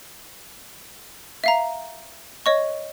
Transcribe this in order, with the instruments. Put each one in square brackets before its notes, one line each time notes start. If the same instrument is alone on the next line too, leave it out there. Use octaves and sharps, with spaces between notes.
[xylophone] E5 F5 A#5
C#5 D#5 C#6